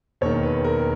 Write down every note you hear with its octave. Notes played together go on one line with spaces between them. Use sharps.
E1 D#2 D#3 C#5
B4
A#4